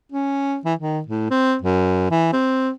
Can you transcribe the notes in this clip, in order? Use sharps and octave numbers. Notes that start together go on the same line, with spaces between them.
C#4
E3
D#3
A2
C4
F#2
E3
C4